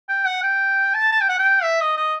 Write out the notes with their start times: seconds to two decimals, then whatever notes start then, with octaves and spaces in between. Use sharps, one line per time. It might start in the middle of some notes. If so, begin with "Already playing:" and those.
0.09 G5
0.26 F#5
0.43 G5
0.94 A5
1.12 A5
1.21 G5
1.29 F#5
1.39 G5
1.63 E5
1.81 D#5
1.97 D#5